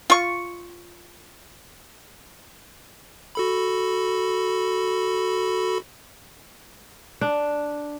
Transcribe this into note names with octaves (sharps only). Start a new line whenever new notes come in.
F4 C#6
F#4 A4 B5
D4